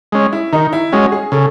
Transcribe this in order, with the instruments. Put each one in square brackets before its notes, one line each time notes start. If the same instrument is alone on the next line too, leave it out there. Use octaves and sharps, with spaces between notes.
[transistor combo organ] G#3 C#4
[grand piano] E4
[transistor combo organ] D#3 [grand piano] D#4
[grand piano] E4
[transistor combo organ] G#3 C#4 [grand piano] F#4
[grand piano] G#4
[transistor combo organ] C#3 [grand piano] A4